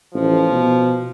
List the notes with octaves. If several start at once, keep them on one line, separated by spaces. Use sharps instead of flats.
A1 F3
B2